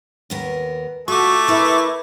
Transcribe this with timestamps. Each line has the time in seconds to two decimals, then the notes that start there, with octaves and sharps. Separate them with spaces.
0.30 D#2 B3 A#4
1.08 A3 F4 F#4 C#6 D6
1.48 E4 A#4 B4